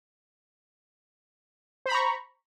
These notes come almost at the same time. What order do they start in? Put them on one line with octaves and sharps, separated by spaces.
C5 B5 A#5 C#6